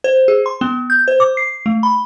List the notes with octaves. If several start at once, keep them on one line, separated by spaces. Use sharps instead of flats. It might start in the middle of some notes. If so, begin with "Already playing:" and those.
C5
G#4
C6
B3
G6
C5
D6
C7
A3
B5